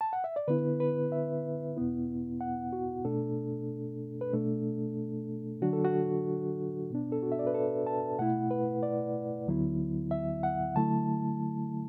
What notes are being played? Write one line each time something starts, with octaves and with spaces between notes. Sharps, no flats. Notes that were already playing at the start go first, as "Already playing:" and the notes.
A5
F#5
E5
D5
D3 B3 E4 B4
B4
E5
E2 B2 B3 E4
F#5
F#4
B2 A3 D4 A4
B4
B2 A3 D4 A4
D3 F#3 D4 F#4
A4
F#4
B2 B3 D4
A4
F#4
E5
D5
B4
A4
A5
B2 A3 E4 F#5
B4
D5
D2 D3 F#3 B3 E4
E5
F#5
D3 F#3 A3 E4 A5